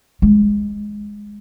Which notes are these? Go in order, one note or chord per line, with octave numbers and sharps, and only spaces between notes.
G#3